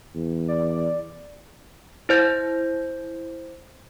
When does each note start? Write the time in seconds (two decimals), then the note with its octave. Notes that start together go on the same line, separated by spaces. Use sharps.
0.15 E2
0.48 D5
2.09 E4 C5 G6 A#6